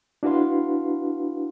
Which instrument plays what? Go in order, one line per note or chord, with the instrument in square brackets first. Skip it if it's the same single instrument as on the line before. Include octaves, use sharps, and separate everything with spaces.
[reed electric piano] D4 E4 F#4 B4 F5 C6